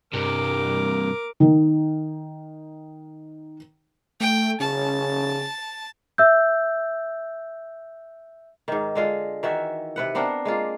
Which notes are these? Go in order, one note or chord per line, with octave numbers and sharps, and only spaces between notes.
G2 C3 A#4 D6
D#3 D#4
A3 G5
C#3 C#4 A5
E5 E6 G6
G#2 D#3
D3 G#3 F4
D#3 E3 F#4 E5
C3 B4 F#5
B3 C4 D4 A#4
G#3 A#3 F4